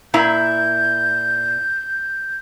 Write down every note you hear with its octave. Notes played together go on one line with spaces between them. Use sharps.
A#2 E4 A#5 G6